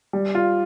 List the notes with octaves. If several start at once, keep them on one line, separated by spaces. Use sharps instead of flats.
G3
F4